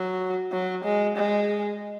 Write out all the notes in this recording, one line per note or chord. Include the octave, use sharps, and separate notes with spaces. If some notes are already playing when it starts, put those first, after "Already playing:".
Already playing: F#3
F#3
G#3
G#3